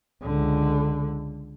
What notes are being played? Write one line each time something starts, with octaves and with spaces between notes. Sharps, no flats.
C#2 D3